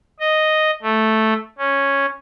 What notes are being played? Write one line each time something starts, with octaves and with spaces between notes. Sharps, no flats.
D#5
A3
C#4